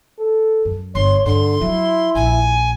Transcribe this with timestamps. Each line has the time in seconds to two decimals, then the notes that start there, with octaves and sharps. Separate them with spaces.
0.19 A4
0.65 F#2
0.95 G1 C#5 C6
1.26 G2 D3 C6
1.62 F#3 E4
2.15 A#1 G#5